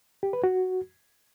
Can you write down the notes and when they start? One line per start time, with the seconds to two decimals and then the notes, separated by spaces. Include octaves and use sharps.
0.23 G4
0.33 B4
0.44 F#4